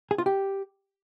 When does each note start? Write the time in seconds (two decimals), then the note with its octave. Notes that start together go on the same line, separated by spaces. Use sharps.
0.11 G#4
0.18 F4
0.26 G4